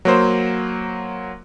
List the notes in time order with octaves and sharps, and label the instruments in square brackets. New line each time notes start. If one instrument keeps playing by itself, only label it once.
[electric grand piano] F#3 A#3 C5